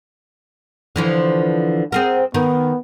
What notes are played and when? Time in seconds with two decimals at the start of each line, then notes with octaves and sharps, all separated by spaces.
0.96 D3 E3 F3
1.92 C4 G#4 A#4 F#5
2.34 D#3 B3